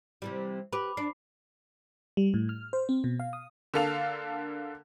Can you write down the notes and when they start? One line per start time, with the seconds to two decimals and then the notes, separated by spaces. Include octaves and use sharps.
0.22 C3 E3 G3
0.73 G4 B4 B5 D6
0.97 D4 C7
2.17 G3
2.34 A2
2.49 F6
2.73 C5
2.89 C4
3.04 B2
3.20 F5
3.33 D#6
3.74 D3 A#3 A4 F5 F7